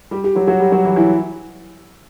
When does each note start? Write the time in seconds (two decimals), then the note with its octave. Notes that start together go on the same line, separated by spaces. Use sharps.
0.11 G3 G4
0.24 G4
0.35 F#3 F#4
0.47 F#3 F#4
0.60 G3 G4
0.72 F#3 F#4
0.85 E3 E4
0.96 E3 E4